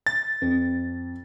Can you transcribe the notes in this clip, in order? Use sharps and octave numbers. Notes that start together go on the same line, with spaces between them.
A6
F2